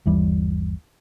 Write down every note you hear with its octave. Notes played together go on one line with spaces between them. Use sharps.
G1 D#2 E3 G3